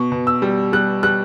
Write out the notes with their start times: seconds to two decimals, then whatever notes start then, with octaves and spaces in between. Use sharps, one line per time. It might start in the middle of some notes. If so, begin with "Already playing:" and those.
Already playing: B2 C#6
0.12 B2
0.27 E6
0.42 G3
0.73 G3 F#6
1.03 G3 F#6